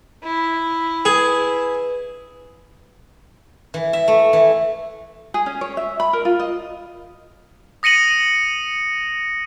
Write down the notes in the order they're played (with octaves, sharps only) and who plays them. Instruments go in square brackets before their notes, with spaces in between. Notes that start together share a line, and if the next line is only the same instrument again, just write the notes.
[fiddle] E4
[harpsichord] G#4 [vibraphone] B4
[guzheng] E3
E5
A3
E3
[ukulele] G#4
C#4
C#5
E5
B5
A#4
F4
D#5
[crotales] D#6 A#6 C#7 D#7 F#7